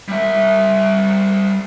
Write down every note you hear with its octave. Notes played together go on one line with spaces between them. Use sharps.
G3 E5